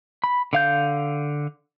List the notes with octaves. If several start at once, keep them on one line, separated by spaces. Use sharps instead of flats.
B5
D3 F5 G6